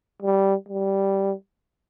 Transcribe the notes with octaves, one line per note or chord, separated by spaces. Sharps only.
G3
G3